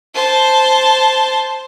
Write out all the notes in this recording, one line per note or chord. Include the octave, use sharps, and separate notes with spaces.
C5 A5